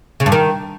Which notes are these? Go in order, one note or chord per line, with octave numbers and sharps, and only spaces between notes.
C#3
G2
D#3